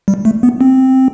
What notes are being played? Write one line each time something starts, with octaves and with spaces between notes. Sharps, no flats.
G3
A3
B3
C4